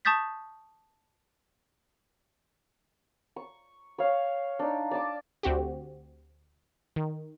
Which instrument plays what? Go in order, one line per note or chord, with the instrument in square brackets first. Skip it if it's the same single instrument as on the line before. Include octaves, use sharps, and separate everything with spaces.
[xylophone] A5 C#6 D#6 G6 A6 B6
[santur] C#6
C#5 F5
D4 D#4
D5 A5 D6
[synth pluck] D2 C4 F#4 G4
D#3